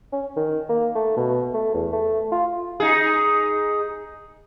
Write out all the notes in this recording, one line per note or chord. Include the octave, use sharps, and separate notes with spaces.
C#4
D#3
A#3
A3
B2
A3
E2
A3
F4
D#4 G#4